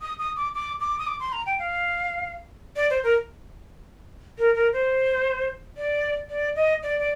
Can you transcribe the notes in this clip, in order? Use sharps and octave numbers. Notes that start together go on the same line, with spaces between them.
D#6
D#6
D6
D6
D6
D#6
D6
C6
A#5
G5
F5
D5
C5
A#4
A#4
A#4
C5
D5
D5
D#5
D5
D5